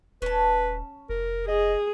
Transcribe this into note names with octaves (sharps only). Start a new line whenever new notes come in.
D#1 C#4 B4 A5
F1 A#4
G#4 D#5